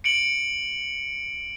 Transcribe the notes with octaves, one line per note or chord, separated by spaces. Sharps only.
C#7 D7 F#7